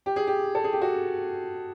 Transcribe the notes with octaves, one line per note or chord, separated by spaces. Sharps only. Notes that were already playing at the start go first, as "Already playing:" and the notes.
G4
G#4
G4
A4
G#4
G4
F#4